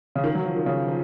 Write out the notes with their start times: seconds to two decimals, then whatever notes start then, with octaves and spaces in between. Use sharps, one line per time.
0.16 C#3
0.24 D#3
0.35 F#3
0.45 F3
0.56 D#3
0.66 C#3
0.88 F3